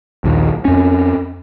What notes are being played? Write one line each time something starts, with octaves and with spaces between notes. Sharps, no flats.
A#1 D#2
F2 C#4